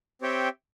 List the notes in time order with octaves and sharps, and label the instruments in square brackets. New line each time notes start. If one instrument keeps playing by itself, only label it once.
[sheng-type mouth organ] C4 G4 C#5 E5 G5